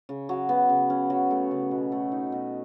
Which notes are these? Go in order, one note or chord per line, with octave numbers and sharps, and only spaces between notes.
C#3
F#3
B3
C#3
C#4
F#3
A3
C#3
B2
A3
D#4
B2